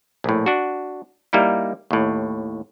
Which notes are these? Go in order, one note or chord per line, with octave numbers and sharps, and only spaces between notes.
A#1 A2
D4 F#4
G3 A#3 D#4 E4
D#2 A2